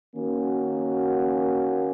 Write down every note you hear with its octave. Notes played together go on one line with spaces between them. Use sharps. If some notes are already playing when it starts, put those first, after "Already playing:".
D#3 A#3 C#4 F#4